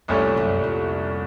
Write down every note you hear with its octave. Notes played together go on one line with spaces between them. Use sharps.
C2 F2 A#2 A3 C#4
F#2
F2